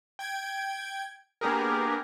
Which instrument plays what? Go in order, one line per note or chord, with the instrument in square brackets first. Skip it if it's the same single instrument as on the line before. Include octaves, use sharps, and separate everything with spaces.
[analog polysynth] G5 G#6 D7
A#3 B3 D4 G4 G#4 A#4